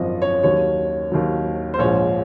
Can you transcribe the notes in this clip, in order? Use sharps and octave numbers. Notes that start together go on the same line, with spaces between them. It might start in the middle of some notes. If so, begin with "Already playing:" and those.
Already playing: G#1 F#2 F3 D#5
C#5
D#2 D#3 F#3 C#5
D#2 D#3 F#3
C5
A#1 G#2 F3 C#5